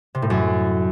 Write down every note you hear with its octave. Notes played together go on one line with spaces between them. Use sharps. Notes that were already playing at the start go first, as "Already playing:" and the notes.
C3
A2
F#2